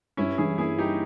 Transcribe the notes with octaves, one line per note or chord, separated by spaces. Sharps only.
G2 C#4 E4
E3 E4 G#4
A#3 E4 G#4
D#4 E4 G4